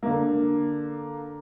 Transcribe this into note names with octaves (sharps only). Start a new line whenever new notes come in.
D3 A#3